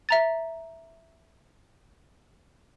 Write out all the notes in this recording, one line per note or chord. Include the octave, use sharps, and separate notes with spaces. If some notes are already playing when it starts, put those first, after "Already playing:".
E5 A#5 A6